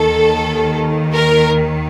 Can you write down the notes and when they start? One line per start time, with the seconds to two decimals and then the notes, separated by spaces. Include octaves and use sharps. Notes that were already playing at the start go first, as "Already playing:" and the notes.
Already playing: D#2 D#3 A4
1.15 A#4